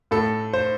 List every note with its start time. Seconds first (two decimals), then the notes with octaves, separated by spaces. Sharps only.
0.11 A2 A4
0.53 C5